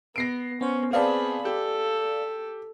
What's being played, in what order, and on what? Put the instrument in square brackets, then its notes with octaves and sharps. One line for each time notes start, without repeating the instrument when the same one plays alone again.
[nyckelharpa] B3 [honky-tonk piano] A#6 C7 D7
[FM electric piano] B3 C5 [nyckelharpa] C#4
[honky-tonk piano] B3 C4 A5 [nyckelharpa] G#4 B5 [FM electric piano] D5 F5
[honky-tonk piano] G4 [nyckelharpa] A4